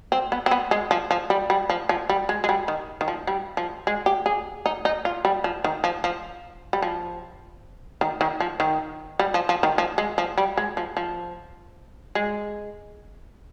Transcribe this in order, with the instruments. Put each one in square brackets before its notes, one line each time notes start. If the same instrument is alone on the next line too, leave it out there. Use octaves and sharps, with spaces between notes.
[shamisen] C4
B3
C4
B3
G#3
F3
F3
G3
G3
F3
F3
G3
G#3
G#3
G3
D#3
D#3
F3
G3
F3
G#3
G4
G#4
D#4
D#4
F4
G3
F3
D#3
F3
F3
G3
F3
D#3
D#3
F3
D#3
G3
F3
F3
D#3
F3
G#3
F3
G3
G#3
F3
F3
G#3